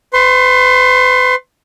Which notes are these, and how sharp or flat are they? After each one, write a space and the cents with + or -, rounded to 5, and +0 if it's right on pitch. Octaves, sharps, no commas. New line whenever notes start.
B4 +40 C6 +20